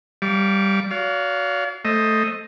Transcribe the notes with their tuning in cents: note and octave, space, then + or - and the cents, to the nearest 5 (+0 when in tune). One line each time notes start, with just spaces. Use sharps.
G3 +0 F5 +0 D6 -40
F#4 +0 D5 -45 F5 +0
A3 +0 C5 +10 D#5 +0